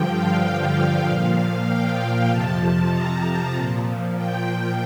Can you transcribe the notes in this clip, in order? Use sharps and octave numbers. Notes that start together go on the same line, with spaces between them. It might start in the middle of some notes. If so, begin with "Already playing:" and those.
Already playing: G2 D3 F3 G5
F5
F5
F5
A#2 F3
G5
F2 C3 F3 A5
A5
A#5
A#2 F3
G5